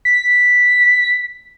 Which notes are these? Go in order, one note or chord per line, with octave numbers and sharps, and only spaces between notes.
B6